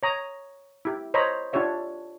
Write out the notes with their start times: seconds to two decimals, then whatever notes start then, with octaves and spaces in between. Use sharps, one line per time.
0.03 C#5 A#5 D#6
0.85 E4 G4
1.14 C5 C#5 D#5 A#5 B5
1.53 D4 F4 G4 C#5 E5